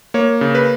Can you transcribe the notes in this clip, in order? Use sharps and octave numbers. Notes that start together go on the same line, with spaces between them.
A#3 C#5
C#3
B4